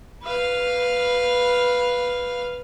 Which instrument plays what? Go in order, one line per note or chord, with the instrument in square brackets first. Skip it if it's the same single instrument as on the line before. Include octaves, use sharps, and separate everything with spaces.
[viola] B4 F5